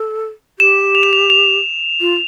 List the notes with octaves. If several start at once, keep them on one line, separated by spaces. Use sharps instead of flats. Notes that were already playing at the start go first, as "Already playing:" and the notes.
Already playing: A4
G4 E7
F7
E7
F7
F7
F4